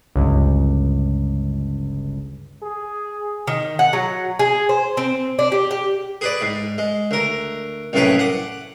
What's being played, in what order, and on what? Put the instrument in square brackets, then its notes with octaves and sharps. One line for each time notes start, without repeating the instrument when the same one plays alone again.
[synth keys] G1 C#2
[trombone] G#4
[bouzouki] D#3
F#5
F#3
G#4
C5
C4
D4
G4
G4
[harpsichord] G#4 B4 D5
G#2
G#3
D2 A#4
C2 F#2 A2 A#3 G#4 B4
F#5 D6